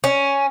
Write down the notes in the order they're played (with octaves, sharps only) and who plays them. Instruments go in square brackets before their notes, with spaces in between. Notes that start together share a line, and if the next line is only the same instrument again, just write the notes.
[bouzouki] C#4